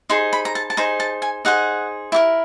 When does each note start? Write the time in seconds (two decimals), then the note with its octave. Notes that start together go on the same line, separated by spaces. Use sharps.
0.09 D#4 G#4 C5 C6
0.33 B5
0.45 A#5
0.55 A5
0.70 A5
0.77 D#4 G#4 C5 A#5
1.00 A5
1.22 G#5
1.45 D#4 G#4 C5 F#5
2.12 E4 G4 A#4